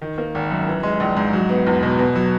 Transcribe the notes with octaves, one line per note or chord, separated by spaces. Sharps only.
D#3
A#3
G#1
F#2
E3
G#3
A#1
G#2
F#3
B3
E2
B2
B2
F#3